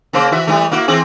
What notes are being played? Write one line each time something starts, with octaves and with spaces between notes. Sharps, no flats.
C#3 A#3 C5
E3 F#4 E5
E3 G3 A3
A#3 E4 F#4
E3 C4 G#4